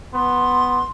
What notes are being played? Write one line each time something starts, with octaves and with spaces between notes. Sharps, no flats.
B3 C6